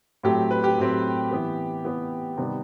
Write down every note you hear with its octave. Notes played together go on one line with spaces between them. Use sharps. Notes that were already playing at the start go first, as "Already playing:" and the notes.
A2 F#3 A3 C4 G4
B4
G4
A2 F#3 A3 C4
E3 B3
E3 B3
C3 D#3 G3 B3